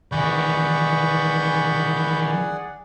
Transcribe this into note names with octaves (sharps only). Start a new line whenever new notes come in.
D#3 E3 G#4 D5 F#5 B5 C#6 G6